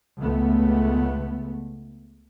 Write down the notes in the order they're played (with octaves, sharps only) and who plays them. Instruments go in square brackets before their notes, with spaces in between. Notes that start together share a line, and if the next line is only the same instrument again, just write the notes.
[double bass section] C#2 A3 B3